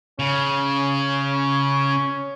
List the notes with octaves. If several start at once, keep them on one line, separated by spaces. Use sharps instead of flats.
C#3 C#4